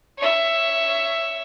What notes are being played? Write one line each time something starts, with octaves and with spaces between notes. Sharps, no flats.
C#5 E5